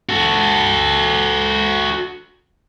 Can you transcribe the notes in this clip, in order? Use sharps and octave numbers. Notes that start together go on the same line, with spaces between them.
F#4 A4